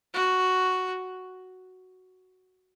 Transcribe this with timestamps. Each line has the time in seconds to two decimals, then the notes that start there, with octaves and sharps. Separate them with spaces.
0.14 F#4